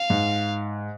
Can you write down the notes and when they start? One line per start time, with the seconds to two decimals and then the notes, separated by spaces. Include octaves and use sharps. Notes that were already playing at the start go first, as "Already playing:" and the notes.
Already playing: F5
0.10 G#2